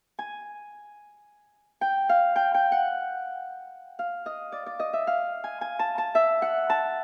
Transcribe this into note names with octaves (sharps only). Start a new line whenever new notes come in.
G#5
G5
F5
G5
G5
F#5
F5
D#5
D5
D5
D#5
E5
F5
G#5
G#5
A5
A5
E5
F#5
A5